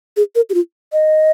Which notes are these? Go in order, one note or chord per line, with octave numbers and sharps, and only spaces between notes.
G#4
A#4
G4
F4
D#5